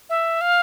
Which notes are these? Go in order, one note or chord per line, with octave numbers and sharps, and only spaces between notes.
E5
F5